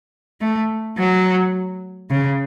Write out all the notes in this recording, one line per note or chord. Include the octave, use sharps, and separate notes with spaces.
A3
F#3
C#3